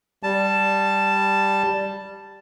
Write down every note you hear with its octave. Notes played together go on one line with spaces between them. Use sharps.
G3 A5